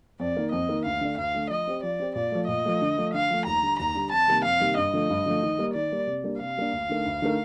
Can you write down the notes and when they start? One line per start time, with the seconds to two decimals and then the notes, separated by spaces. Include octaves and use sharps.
0.20 F2 D5
0.37 D#3 A#3
0.52 F2 D#5
0.69 D#3 A#3
0.86 D2 F5
1.01 D3 A3 D4
1.18 D2 F5
1.34 D3 A3 D4
1.50 F3 D#5
1.67 C4 G4 C5
1.83 F3 D5
2.00 C4 G4 C5
2.15 A#2 D5
2.32 F3 A3
2.48 A#2 D#5
2.65 F3 A3
2.82 D3
2.98 F3 A3
3.14 D3 F5
3.30 F3 A3
3.46 D#2 A#5
3.62 D3 G3
3.79 D#2 A#5
3.95 D3 G3
4.12 F2 A5
4.28 C3 D#3 G3 A#3
4.44 F2 F5
4.60 C3 D#3 G3 A#3
4.77 G2 D#5
4.93 D3 F3 A3
5.10 G2
5.26 D3 F3 A3
5.43 D#3
5.58 G3 A#3
5.75 D#3 D5
5.92 G3 A#3
6.07 C3
6.23 G3 A#3 D4
6.40 C3 F5
6.57 G3 A#3 D4
6.73 D2
6.89 D3 A3 D#4 A#4
7.06 D2
7.22 D3 A3 D#4 A#4